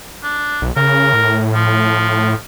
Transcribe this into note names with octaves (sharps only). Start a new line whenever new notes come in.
D4
B1
C#3 A#4
A2
F3